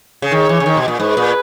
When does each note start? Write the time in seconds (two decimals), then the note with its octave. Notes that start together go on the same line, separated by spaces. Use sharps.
0.22 C#3
0.31 D#3 C#5
0.49 E3
0.60 C#3
0.66 D#3
0.77 B2
0.88 A#2
0.99 G#2 B4
1.17 A#2